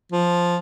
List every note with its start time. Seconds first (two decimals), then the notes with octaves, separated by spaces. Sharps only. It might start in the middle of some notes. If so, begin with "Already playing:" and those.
0.12 F3